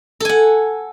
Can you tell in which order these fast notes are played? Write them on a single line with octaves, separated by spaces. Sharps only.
A4 G#5 F#5